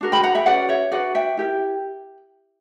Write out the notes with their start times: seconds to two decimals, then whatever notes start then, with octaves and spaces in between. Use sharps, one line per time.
0.01 D4 F#4 A#4
0.12 G5 B5
0.23 F#5 A#5
0.35 E5 G5
0.46 C#4 F#4 B4 D5 F#5
0.69 C#5 E5
0.92 D4 F#4 B4 D5 F#5
1.15 E5 G5
1.37 E4 G4 A#4